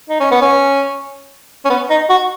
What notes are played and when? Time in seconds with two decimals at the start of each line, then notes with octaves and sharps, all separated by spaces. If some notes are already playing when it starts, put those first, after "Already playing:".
0.10 D#4
0.20 C#4
0.31 B3
0.42 C#4
1.65 C#4
1.70 B3
1.90 D#4
2.10 F#4